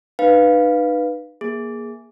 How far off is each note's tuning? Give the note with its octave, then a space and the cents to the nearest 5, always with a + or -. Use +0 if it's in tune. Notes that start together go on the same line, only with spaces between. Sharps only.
D#4 -40 B4 +0 F5 +0
A#3 +20 G#4 +0